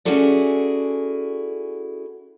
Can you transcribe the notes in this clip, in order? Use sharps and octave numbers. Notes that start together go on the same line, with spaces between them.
C#4 E4 F#4 G#4 A4 D5